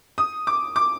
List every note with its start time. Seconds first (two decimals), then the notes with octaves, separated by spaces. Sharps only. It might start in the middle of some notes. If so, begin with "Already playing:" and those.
0.18 D#6
0.47 D6
0.76 D6